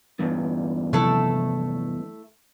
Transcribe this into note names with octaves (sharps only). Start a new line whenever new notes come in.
E2 G2
C3 F3 F#3 A3 E4 A4